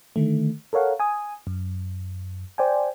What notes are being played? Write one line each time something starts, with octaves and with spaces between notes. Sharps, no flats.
D3 D#3 A3
A4 A#4 C#5 F5 F#5
G#5 D#6
F#2
C5 D5 G5 G#5